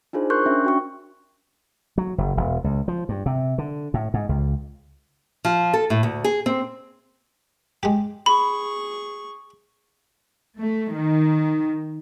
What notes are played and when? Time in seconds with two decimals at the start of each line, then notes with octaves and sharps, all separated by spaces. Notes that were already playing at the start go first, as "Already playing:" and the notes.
0.13 D4 D#4 F4 G#4 C5
0.30 A#4 C6 C#6 F#6 G6
0.46 C#4 D4 E5
0.65 F#4 G5 C#6
1.98 F#3
2.18 F#1
2.37 E1
2.64 C#2
2.88 F3
3.09 G2
3.26 C3
3.58 D3
3.94 A2
4.14 G#2
4.29 C#2
5.45 F3
5.74 A4
5.90 A2
6.03 D2
6.24 G#4
6.46 C4
7.83 G#3 G4
8.26 G#4 B5 C#6
10.57 A3
10.94 D#3